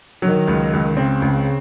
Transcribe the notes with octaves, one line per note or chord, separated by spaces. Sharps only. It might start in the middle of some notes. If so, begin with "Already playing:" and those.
D#3 F#3
C#2
C#2
C#3 C4
C#2